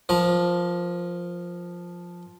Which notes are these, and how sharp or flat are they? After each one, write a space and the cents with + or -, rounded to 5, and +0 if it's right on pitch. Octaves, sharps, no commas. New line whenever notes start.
F3 +5 A#4 +35 D6 +10